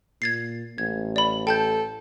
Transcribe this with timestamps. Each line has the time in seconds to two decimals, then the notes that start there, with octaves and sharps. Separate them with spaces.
0.22 A#2 G#6 A6 C7
0.78 A1 G#6
1.16 D5 B5
1.47 A4 G5 A5 G6